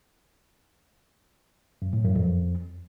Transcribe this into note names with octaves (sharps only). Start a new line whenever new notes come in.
F#2
A2
F#2
F2